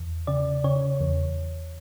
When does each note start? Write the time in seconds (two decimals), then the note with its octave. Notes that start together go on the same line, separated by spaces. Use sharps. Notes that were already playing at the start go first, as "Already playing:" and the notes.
Already playing: E2
0.27 C#3 D5
0.64 C#3 C#5
1.00 E2